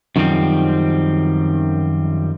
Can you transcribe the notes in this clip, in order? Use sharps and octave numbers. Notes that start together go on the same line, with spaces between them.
F#2 D#3 F3 G3 C4